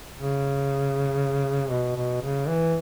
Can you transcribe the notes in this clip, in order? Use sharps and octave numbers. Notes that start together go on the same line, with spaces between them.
C#3
B2
B2
C#3
E3